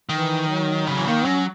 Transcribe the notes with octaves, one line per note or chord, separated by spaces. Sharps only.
D#3 E3
F#3
C#3 F#3
E3
D#3 A#3
F#3 C#4